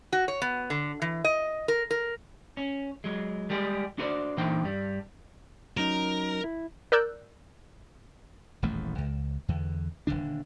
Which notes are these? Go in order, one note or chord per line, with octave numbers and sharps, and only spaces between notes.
F#4
C#5
B3
D3
E3
D#5
A#4
A#4
C#4
F#3 G#3
G3 G#3 G4 G#4
D4 F#4 G#4 B4 C5 D5
A#2 E3 D4 D#4 C5 G5
G2 G3
F#3 C#4 D#4 A#4
E4
A#4 D5 E6 F#6 G6
D#1 A1 E2 A3
C#2
E2 D3
D#1 C2 D3 D4